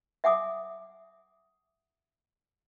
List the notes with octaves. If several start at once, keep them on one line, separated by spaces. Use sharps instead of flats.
E5 F#5 G#5 D6 D#6